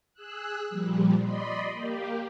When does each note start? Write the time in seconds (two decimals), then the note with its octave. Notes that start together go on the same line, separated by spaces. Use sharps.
0.14 G#4 E6 F#6
0.69 A#2 F3 G3
1.21 D5 D#5 B5 C6
1.70 A#3 G4